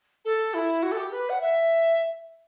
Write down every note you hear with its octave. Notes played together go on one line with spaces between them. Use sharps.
A4
E4
F#4
A4
G4
B4
F#5
E5